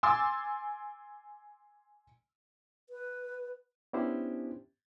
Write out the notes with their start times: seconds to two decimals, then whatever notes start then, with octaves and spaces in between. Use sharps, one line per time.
0.03 G#5 C6 D6 E6 A6
2.90 B4
3.93 B3 C#4 D4 E4 G4 C5